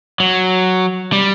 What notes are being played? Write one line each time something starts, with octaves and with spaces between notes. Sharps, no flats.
F#3
G3